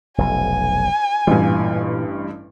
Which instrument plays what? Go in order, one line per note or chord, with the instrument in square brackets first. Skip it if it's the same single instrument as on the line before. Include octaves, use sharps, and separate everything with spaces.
[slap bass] F1 B1 [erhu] G#5
[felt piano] A1 G2 [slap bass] A#2 E3